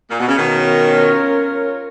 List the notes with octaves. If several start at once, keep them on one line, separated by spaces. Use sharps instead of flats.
A#2
B2
C#3
B2 D#3 C#4 F4 A#4 C#5